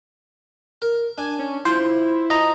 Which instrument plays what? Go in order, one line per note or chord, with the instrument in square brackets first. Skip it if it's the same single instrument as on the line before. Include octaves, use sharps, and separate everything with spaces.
[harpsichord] A#4
[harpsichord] D4 [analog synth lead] G#5
[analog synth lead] C#4
[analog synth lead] E4 [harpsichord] F4 [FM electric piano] C5
[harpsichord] F3 [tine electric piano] D#5 A#5